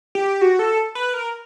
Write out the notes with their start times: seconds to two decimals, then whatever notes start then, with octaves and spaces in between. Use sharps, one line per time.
0.15 G4
0.41 F#4
0.59 A4
0.95 B4
1.14 A#4